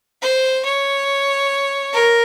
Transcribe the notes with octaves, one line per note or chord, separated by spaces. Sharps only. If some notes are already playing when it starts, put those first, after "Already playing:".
C5
C#5
A#4